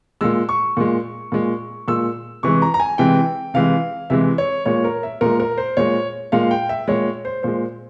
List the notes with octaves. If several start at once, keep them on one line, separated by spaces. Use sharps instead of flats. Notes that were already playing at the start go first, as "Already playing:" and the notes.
A#2 G#3 E6
C#6
A#2 G#3
A#2 G#3
A#2 G#3 E6
C3 E3 G#3 C#6
A#5
A#5
G#5
C3 E3 G#3 G5
C3 E3 G#3 F5
C3 E3 G#3 E5
C#5
A#2 G#3 C#5
A#4
E5
A#2 G#3 A#4
A#4
C5
A#2 G#3 C#5
A#2 G#3 F5
G5
E5
A#2 G#3 C#5
C5
A#2 G#3 C5